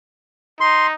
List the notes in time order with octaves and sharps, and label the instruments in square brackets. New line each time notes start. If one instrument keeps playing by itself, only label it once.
[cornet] D#4 [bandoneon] C6